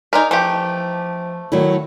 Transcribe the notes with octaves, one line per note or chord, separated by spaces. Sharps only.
D#4 A#4 B4 D5 G#5
E3 F3 A3 C4 G4 A4
D#3 F#3 A3 E4